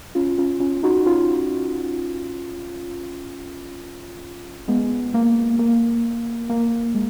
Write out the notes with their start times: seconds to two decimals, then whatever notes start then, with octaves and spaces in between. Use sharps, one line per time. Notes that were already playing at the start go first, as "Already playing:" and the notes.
0.15 C#4 F4
0.38 C#4 F4
0.60 C#4 F4
0.83 D#4 F#4
1.06 C#4 F4
4.68 G#3 B3
5.14 A#3
5.59 A#3
6.50 A#3
6.95 G#3